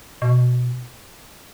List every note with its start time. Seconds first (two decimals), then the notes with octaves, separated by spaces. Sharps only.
0.22 B2